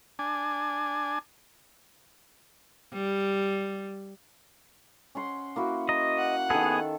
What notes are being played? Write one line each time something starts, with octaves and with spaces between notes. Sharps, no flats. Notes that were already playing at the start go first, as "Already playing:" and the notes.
D4 G#5
G3
C#4 F#5 C6
A#3 E4 F#4
D#5 A#5
F#5
D#3 B3 G#4 A4